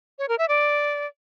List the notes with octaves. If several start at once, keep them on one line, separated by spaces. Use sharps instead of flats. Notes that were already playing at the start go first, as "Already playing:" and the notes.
C#5
A#4
E5
D5